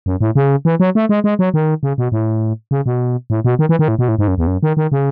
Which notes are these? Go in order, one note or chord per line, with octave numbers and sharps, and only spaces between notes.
F#2
A2
C#3
E3
F#3
A3
G#3
G#3
F#3
D#3
C#3
B2
A2
C#3
B2
A2
B2
D#3
E3
D#3
A2
B2
A2
G#2
F#2
E2
F#2
D#3
D#3
C#3